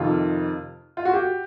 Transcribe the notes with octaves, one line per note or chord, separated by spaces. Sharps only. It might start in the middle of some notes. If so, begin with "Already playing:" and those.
Already playing: F2 C3 D#3 F4
F4
F#4
G4